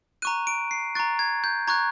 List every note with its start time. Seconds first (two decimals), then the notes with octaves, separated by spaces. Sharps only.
0.22 A#5 C#6 F#6 D#7
0.47 D7
0.71 C7
0.95 A#5 C#6 F#6 A6
1.19 G#6
1.44 G6
1.68 A#5 C#6 F#6 G#6